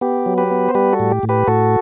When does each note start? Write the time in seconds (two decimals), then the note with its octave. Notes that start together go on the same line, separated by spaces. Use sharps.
0.01 B3 G4
0.26 F#3
0.38 G4 B4
0.51 B3
0.69 C5
0.75 G3 G4 B4
0.93 F#4 A4
1.00 A2
1.11 G4
1.23 A2
1.29 G4 B4
1.47 A2 F#4 A4